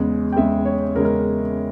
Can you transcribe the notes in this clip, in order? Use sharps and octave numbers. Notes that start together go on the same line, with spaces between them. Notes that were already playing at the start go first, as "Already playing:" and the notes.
Already playing: E2 C#3 G#3
G5
E2 C#3 G#3 E5
C#5
E2 C#3 G#3 A#4
A#4